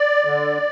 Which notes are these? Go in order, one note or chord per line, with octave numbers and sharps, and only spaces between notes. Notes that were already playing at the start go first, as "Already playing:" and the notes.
Already playing: D5
D3